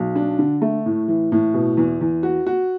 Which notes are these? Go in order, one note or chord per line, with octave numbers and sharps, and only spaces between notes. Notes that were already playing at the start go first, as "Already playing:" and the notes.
Already playing: B1
D4
D3
A3
A2
E3
A2
B2
E2
E2
F#4
F#4